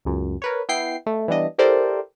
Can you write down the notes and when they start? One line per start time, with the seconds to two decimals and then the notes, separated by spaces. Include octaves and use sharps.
0.05 C#2 F#2
0.42 A#4 B4 C#5
0.69 B3 E4 G5 C7
1.06 A3
1.28 E3 G3 B3 D4 D#5
1.58 E4 G4 A4 A#4 C5 D5